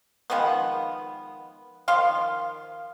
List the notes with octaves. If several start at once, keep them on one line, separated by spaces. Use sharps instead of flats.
D#3 F3 G#3 B3
D#3 F3 F5 C6